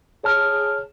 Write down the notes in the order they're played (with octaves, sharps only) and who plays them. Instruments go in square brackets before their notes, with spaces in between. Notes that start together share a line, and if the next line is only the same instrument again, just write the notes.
[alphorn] G#4 [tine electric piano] C#5 A5 F6